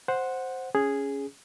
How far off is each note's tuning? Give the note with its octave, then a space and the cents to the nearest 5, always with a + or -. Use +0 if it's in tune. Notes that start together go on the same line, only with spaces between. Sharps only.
C5 +0 F#5 -5
C#4 +10 G#4 -5